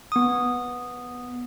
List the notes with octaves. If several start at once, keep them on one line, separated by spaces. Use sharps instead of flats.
B3 D#6